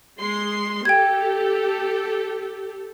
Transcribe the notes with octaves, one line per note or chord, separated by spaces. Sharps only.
G#3 C6
G4 A4 G5 G#6